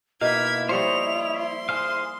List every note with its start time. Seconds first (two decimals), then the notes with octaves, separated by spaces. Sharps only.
0.21 B2 A#3 D#4 E4 F5 G#6 B6
0.69 F3 G3 C5 C#5 D#5 F7
1.37 C6
1.69 G#4 C5 F5